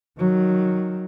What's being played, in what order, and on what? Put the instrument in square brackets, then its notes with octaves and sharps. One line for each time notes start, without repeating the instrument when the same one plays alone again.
[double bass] D#3 F#3